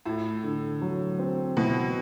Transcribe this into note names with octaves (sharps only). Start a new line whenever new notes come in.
A2 E4
D3
F#3
C4
B2 E4